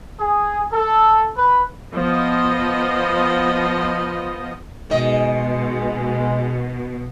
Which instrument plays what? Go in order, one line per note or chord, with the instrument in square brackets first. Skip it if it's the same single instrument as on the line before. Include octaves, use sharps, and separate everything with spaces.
[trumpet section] G#4
A4
B4
[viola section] F3 B3 D#5
[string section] B2 [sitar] D#3 D#5 [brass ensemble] G#3